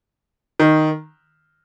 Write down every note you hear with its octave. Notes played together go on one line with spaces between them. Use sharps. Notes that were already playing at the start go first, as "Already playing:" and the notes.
D#3